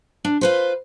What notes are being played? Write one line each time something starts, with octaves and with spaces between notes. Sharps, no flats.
D4
F4 B4 C5